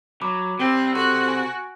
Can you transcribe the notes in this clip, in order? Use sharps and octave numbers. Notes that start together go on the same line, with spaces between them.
F#3 B5 D6
C3 C4 E4
F#4 A4 C6 F#6
G#5